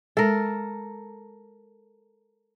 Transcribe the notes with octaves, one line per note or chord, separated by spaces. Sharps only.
G#3 A4 A#4